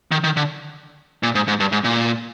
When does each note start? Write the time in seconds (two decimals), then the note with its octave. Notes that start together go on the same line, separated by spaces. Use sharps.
0.12 D#3
0.24 D#3
0.37 D3
1.23 A#2
1.35 G#2
1.48 G#2
1.60 G2
1.72 G#2
1.84 A#2